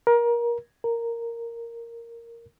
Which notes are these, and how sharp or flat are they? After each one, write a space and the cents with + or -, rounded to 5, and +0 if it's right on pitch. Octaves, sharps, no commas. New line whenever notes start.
A#4 +25
A#4 -5